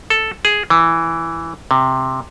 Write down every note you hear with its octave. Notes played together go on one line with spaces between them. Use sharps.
A4
G#4
E3
C3